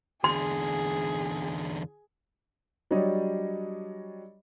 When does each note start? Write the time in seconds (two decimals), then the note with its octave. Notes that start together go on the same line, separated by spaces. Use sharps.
0.24 E2 D3 G#4 C6
2.91 F#3 G3 D4 C#5 D#5